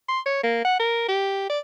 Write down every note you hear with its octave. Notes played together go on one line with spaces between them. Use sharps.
C6
C#5
A#3
F#5
A#4
G4
D5